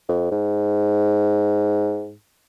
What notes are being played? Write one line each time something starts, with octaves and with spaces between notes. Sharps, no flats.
F2
G#2